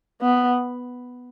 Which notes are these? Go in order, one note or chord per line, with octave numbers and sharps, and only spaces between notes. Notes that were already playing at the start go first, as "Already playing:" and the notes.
B3